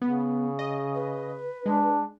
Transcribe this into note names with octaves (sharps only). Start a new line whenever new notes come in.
C#3 B3
D#5
B4
G#3 D4